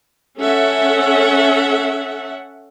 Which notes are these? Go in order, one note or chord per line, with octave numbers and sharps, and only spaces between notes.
C#4 A4 E5 F#5